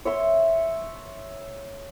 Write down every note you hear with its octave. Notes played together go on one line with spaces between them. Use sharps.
C#5 E5 C6